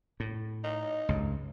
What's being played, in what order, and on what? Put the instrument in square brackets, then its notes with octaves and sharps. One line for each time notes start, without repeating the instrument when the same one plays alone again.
[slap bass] A2
[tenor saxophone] D#4
[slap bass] C#2 G2